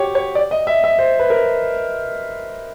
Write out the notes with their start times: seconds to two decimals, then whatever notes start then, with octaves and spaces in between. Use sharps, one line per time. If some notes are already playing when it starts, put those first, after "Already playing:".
Already playing: F#4 G4 C#5
0.15 C#5
0.35 D5
0.51 D#5
0.67 E5
0.84 E5
0.99 C5
1.19 B4
1.30 A#4